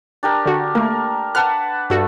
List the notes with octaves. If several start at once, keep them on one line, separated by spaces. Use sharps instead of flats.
D4 G4 A#4
D3 F#4
A3 A#3 A#4
B4 F#5 A5 F6
G2 A3 F#4